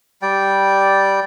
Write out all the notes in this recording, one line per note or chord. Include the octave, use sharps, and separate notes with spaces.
G3 D5 G5